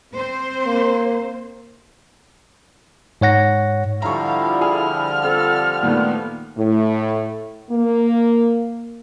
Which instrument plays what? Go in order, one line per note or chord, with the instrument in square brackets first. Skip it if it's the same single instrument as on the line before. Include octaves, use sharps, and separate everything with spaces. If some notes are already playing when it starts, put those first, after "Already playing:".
[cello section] C4 C5
[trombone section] A#3
[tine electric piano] G#2 C#5 F#5 A#6
[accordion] D3 F3 G3 [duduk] E4 [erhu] F5 [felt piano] A#5 C#6
[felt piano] G#4 [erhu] F6
[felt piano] C4 [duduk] A4
[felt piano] A#2 D#3 A3 [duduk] B3
[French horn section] A2
A#3